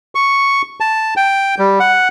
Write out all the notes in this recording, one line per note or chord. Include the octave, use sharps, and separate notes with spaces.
C#6
A5
G5
G3
F#5